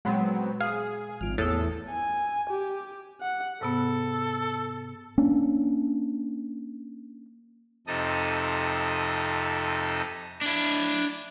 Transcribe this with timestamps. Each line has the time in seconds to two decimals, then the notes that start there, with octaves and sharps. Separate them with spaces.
0.05 A#2 F#3 G#3 B3 C4
0.61 G#4 F5
1.21 G#1 F3 F4 F6 D7
1.38 E2 A2 A4 A5 D#6
1.90 G#5
2.50 G4
3.21 F#5
3.61 G#2 C3 B3 A4
5.18 A#3 C#4 D4
7.87 F2 C3 D#4 A4 D#6
10.41 D4 E4